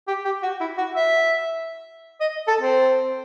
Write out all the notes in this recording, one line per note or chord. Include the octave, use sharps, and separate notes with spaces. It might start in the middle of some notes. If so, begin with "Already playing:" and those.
G4
G4
F#4
E4
F#4
E5
D#5
A4
C4